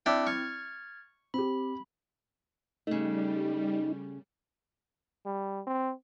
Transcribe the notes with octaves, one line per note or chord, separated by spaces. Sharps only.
C4 D4 E4 E5 G5
C#6 F6 G#6 A6
C4 G4 B5
C#3 G3 A3 D#4
G3
C4